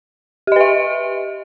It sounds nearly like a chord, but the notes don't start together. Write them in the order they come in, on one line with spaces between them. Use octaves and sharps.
G4 D#5 B4 E5